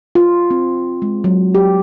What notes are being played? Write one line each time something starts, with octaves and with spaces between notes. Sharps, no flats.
F4
C4
G#3
F#3
G4